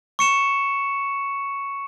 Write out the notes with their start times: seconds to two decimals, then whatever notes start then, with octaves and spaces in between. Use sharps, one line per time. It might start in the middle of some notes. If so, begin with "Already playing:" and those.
0.19 C#6 C#7 E7